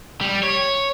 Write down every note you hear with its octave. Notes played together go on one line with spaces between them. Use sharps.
G3
C#5